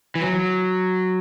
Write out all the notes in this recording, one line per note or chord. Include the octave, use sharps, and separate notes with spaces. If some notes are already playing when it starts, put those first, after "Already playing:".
E3
F#3